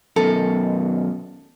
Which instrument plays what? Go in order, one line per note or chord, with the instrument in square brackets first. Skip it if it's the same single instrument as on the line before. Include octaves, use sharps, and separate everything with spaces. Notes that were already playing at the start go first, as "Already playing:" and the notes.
[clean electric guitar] F#2 B2 D#3 [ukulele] A4